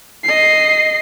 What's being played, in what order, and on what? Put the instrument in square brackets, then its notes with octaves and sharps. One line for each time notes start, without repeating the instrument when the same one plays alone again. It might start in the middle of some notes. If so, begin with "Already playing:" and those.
[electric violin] D#5 C7